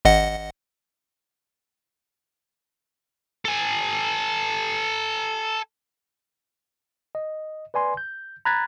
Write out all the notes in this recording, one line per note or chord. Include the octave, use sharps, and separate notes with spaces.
G#1 D#5 F#5
A4 G#5
D#5
B4 D5 G#5 C6
G6
A#5 B5 F#6 G#6 A6 B6